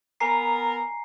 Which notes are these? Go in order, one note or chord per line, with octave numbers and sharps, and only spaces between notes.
B3 A#4 G#5 A#5 C7